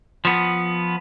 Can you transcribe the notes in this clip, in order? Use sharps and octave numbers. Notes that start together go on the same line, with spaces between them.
F3 B3